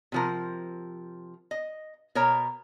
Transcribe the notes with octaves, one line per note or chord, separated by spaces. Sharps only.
C3 F3 A#4
D#5
B2 A#4 C#5 A#5